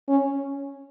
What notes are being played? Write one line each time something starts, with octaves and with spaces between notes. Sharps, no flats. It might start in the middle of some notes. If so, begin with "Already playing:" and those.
C#4